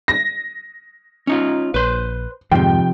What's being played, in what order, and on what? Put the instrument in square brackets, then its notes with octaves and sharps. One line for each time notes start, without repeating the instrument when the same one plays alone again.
[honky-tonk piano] A#6
[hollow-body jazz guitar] C#4 D#4 F4
[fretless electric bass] A#1 [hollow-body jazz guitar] B4 C5
[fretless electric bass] F2 G#2 D#3 [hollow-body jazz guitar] C3 F3 [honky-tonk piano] G5